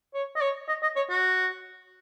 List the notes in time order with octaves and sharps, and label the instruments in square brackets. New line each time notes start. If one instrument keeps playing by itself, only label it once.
[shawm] C#5
D#5
C#5
D#5
D#5
C#5
F#4